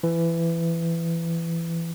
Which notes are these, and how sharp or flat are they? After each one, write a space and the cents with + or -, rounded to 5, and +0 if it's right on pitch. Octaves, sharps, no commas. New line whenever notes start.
E3 +20